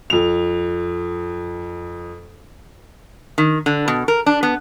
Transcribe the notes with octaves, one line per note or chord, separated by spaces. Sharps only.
F2 F7
D#3
D3
B2
A#4
D4
B3